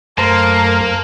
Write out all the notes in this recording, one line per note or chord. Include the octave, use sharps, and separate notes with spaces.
F#2 A3 A#3 A#4 C5 A5